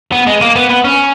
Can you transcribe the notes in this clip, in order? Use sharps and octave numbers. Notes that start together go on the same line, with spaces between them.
B3
G#3
A#3
B3
B3
C#4